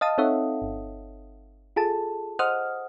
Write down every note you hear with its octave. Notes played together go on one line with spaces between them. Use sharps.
D#5 F5 A5 D#6
C4 D#4 A4 C#5 E5 F#5
G1
F4 G#4 A4 A5
C5 D#5 F#5 D#6 F6